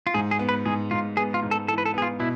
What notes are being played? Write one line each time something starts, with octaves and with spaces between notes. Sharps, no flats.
F4
G#2 G#4
G#4
B3
B4
G#2 G#4
G#2 F4
B3 G#4
F4
G#2
A4
E3 A4
B4
A4
B3 G#4
F4
B2 E4